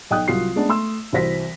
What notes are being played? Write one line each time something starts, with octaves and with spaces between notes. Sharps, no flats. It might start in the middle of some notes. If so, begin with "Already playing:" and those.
B1 D#5 G5 D#6 F#6
C2 F#3 F4 C7
G#3 A3 B3 C#4 D4
A3 C6 E6
C2 E3 F#4 C5 A#6 B6